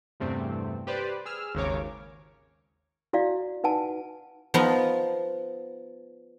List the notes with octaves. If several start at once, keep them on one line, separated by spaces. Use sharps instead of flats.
E2 G2 C3 A3 C4
G4 B4 C5 D5
G#4 E6 F6
G#1 D#2 C#3 A#4 C#5 D6
E4 F#4 D5 F5
D#4 B4 F#5 G#5 A5
F3 B3 D#4 F4